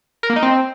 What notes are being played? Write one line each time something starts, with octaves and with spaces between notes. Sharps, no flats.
A#4
A#3
D#4
C4